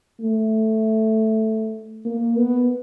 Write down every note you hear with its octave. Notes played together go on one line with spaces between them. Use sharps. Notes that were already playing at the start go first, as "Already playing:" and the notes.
A3
A#3
B3